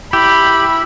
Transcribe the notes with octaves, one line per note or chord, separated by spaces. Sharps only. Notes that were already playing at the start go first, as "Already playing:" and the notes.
E4 G4 B5